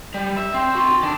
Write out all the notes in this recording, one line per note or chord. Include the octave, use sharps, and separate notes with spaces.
G3
E5
C4
F#4 C6
D#3 D4